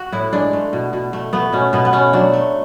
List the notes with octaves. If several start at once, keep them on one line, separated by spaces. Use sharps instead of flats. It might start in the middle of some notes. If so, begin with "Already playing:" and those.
Already playing: F#4
A2 E4
G#3 D4
A3
B2
B2
A3
A3 B3
B2 C#4
B2 B3
B3
A3 C#4
F#3 D4
A3